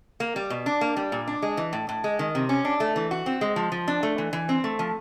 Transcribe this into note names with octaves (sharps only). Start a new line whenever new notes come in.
A#3
G3
B2
D4
A#3
G3
A#2
D4
G#3
E3
A2
A2
G#3
D#3
C3
C#4
D4
A3
E3
F#4
C4
G#3
F3
F3
D4
A3
E3
E3
C4
A3
F3